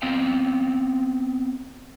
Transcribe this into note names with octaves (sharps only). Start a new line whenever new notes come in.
B3 C4 D#5 F5 G5